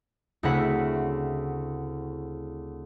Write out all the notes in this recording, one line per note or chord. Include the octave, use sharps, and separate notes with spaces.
D2 C#3 C4 E4 F#5 B6